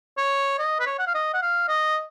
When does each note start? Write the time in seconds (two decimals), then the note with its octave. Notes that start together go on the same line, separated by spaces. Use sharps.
0.18 C#5
0.59 D#5
0.80 B4
0.86 C#5
0.99 F#5
1.07 F5
1.15 D#5
1.34 F#5
1.42 F5
1.68 D#5